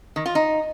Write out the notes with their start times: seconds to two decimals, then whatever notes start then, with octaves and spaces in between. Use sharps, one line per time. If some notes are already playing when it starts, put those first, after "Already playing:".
0.16 D#3
0.26 F4
0.35 D#4